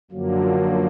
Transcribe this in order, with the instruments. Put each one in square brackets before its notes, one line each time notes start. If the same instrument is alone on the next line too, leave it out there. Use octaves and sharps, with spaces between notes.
[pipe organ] F#2 D3 F3 A#3 [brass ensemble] F#3